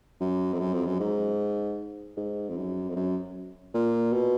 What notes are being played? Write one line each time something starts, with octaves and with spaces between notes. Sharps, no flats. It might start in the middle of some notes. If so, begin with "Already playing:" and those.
F#2
F2
F#2
F2
F#2
G#2
G#2
F2
F#2
F2
F#2
A#2
B2